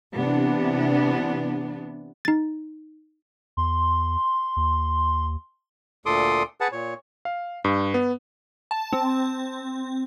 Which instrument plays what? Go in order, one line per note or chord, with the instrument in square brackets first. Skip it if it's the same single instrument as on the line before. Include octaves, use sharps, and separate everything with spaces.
[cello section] C3 E3 B3 D4
[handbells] D#4 A6
[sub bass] E2 [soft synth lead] C6
[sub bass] D#2
[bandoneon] D2 A#2 A4 C6 D6 D#6
G#4 B4 F#5 A5
A#2 C#5
[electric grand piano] F5
G2
B3
[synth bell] A5
C4